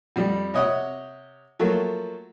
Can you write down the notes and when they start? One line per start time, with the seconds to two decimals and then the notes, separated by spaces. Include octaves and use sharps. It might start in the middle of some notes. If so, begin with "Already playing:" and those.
0.16 F2 G3
0.54 C3 C#5 D#5 F#5
1.59 F3 F#3 A3 A#3